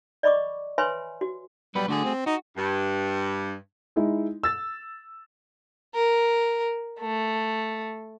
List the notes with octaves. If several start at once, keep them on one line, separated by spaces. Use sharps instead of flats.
D5 D#5 B5 C#6 D6
B4 C#5 E5 G#5 B5 C6
F#4
F#3 G3 B3 B4
D3 A3 F#4 G#4
C4
D#4 F#4
G2
G#3 D#4 E4
E6 A6
A#4
A3